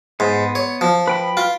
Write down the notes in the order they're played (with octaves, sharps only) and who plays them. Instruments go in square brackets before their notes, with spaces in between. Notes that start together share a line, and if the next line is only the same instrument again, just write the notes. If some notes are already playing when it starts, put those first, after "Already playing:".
[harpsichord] G#2 [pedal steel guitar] B3 C6
[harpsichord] C#5
F3
[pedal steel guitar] B4 G5 B5
[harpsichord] F4